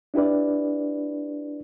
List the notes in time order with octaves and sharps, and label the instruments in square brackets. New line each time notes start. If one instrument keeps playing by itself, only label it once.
[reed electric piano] D4 E4 G4 B4 D5